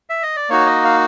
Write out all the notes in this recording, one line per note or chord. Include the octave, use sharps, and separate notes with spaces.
E5
D#5
D5
A#3 D#4 F#4 C#5
D#5
F5